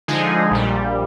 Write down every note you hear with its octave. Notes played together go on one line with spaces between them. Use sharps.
D3 F3 G#3 D#4 G#4
A#1 A#2 G3